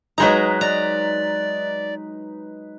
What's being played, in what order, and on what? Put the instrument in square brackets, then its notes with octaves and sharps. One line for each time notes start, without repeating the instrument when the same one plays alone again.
[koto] F#3 G#3 A#5 [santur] D#4 B4
[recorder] D5 [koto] A#5